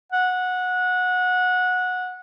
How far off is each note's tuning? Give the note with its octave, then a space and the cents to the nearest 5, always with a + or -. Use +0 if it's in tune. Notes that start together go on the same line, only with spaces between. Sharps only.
F#5 -20